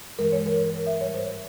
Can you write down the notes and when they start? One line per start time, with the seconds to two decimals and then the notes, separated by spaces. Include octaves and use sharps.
0.19 G2 E3 G#3 A#4
0.32 C#5
0.46 A#4
0.73 A#4
0.87 E5
1.01 G#2 G3 C#5
1.14 C5